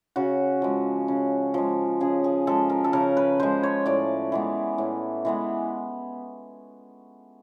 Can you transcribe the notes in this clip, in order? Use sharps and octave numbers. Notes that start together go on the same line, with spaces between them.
C#3 F#4
F3 G#3
C#3
F3 G#3
C#3 G#4
G#4
F3 G#3 A4
A#4
A4
C#3 A#4
B4
F3 G#3 C5
C#5
A2 D5
E3 G#3 B3
A2
E3 G#3 B3